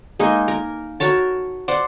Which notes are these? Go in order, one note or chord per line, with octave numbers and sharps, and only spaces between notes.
G#3 A#3 D#4 G#4
A#4
F#4 A#4 C#5 A5
C5 D5 F#5